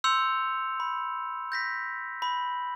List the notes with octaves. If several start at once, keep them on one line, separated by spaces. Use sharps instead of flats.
C6 E6 G6 C#7 F7
B5
G6 A#6 B6
B5 F#7